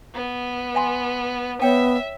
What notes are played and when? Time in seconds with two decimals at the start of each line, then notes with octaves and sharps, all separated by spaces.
0.14 B3
0.75 E5 G#5 C6
1.62 B3 C#5 E5 G5